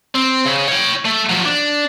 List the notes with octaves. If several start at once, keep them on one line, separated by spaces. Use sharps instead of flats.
C4
C#3
C#5 G5
A3
F3 F#3
D4